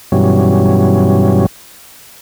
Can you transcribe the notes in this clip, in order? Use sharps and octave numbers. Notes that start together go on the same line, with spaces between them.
G2 B2 E3 F#3 G3 C#4